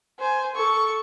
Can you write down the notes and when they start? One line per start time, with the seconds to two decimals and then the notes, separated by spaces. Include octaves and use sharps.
0.19 C5 G#5
0.56 A4 C#6